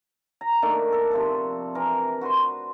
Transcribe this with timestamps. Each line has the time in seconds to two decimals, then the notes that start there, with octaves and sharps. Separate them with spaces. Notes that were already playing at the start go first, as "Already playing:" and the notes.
0.41 A#5
0.62 D#3 A3 A#3 D4
0.92 A4
1.11 C3 F3 A4
1.75 E3 A#4
2.21 F#4 B4 C5 C6